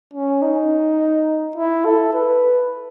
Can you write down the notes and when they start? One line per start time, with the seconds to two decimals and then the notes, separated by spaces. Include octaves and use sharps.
0.14 C#4
0.42 D#4
1.56 E4
1.85 A4
2.13 B4